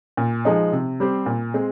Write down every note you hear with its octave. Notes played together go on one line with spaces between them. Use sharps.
A#2
F3 G#3 D#4
C3
G3 C4 G4 C5
A#2
G#3 C4